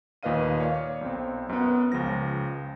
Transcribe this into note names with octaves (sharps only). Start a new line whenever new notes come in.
D#2 A#2 B4 D#5 F5 D#7
C#5 D5 F5
B1 C4
F#2 B3
C#2 C#3 F3 A#6